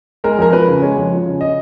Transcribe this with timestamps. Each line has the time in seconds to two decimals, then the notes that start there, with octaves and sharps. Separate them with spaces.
0.24 G#3 A#4
0.38 F2 A#4
0.53 F3 B4
0.68 C#3
0.82 G#3 C#5
0.97 F2
1.12 F3
1.26 C#3
1.41 D#5